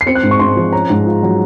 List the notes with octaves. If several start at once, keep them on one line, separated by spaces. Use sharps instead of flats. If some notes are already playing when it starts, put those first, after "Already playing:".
C7
C4 C#7
F#6
G#2
C#6
G#2 C6
F3
C#4 A#5
G#2
F4
F#3